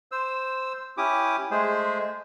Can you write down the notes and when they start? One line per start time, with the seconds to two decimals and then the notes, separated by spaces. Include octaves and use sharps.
0.12 C5 E6
0.98 C#4 E4 G4 D6 D#6
1.51 G#3 A3 G#4 C5